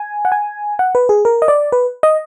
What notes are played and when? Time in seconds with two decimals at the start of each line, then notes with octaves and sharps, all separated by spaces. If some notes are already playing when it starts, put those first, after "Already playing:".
Already playing: G#5
0.25 F#5
0.32 G#5
0.79 F#5
0.95 B4
1.09 G#4
1.25 A#4
1.42 D#5
1.48 D5
1.72 B4
2.03 D#5